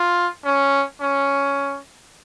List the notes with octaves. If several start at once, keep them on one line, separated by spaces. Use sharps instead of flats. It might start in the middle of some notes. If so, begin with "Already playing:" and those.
Already playing: F4
C#4
C#4